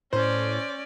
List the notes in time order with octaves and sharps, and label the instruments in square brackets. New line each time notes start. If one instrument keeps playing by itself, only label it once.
[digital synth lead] A2 [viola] C#4 D5 [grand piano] C5